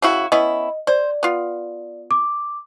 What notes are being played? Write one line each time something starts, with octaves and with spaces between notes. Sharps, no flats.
C#3 E4 F#4
B3 C#4 E4 D#5
C5 D5
B3 F4
D6